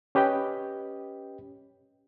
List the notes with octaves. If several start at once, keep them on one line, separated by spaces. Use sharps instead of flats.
C#4 G4 B4 D#5 G5